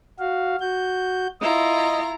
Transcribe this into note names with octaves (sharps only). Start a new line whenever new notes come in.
F#4 F5
F#4 G6
E4 F4 D#5 A#5